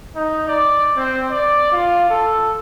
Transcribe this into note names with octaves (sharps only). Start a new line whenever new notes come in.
D#4
D5
C4
D5
F4
A4